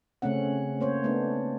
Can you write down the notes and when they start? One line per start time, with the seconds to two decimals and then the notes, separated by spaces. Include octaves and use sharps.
0.22 C#3 A3 C4 C#4 F#5
0.80 A#3 C5 C#5
1.04 A3 B3 C4 D4